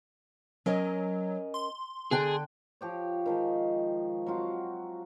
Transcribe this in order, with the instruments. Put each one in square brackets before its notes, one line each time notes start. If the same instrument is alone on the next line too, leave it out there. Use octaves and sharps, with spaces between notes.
[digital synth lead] F#3 [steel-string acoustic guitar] C#4 A#4 D#5
[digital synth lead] C6
[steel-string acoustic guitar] D3 D4 G5 [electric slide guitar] G#4
[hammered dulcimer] F3 G4 C#5
D#3 F3 G#3
F#3 C4 F4 F#4